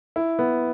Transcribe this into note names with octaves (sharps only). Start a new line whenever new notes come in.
E4
B3